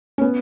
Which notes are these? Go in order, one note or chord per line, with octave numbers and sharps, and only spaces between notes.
C#4
B3